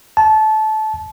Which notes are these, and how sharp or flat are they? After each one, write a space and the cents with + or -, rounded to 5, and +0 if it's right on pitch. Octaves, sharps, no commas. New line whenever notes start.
A5 -20